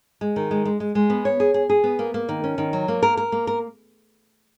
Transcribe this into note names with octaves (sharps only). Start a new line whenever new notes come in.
G#3
D#3
G#3
G#3
G#3
G#3
B3
C#5
G#4
G#4
G#4
B3
A#3
A#3
D#3
C#4
D#3
F#3
A#3
A#4
A#4
A#3
A#4